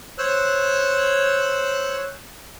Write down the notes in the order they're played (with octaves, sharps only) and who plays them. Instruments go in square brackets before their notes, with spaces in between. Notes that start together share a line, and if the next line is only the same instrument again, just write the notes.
[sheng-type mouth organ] C5 C#5 E6 F#6